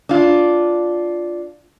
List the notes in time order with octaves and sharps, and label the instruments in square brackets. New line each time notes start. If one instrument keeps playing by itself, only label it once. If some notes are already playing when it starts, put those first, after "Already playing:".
[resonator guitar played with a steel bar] D4 F4